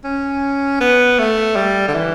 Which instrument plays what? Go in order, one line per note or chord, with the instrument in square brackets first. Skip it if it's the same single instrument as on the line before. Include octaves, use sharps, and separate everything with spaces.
[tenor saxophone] C#4
B3
A3
G3
D3
E3